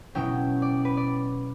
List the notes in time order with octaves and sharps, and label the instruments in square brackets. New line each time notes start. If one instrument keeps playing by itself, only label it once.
[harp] B2 F#3 C#4 E4 G5
D5
B4
D5